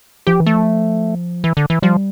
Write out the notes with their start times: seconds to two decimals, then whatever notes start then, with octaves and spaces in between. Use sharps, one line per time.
0.27 F3 G4
0.40 E3
0.46 A3
0.54 F3
1.44 E3
1.57 D3
1.70 E3
1.82 F3 G3